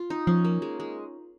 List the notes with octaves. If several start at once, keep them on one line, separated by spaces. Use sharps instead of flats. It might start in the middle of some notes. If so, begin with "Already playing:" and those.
Already playing: F4
D#4
F3 C#4
A#3
G#3
G#3